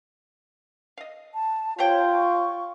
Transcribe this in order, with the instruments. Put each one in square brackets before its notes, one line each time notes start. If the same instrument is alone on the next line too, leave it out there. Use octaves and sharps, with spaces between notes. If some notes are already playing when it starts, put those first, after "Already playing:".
[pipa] D#5 F5
[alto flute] A5
[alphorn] F4 [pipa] G4 C5 G5 [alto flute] C#5
[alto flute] C#6